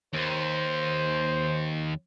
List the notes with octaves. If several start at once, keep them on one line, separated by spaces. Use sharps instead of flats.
D#2 C5